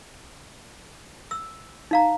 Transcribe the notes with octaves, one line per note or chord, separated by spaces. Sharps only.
E6
D#4 F5 A#5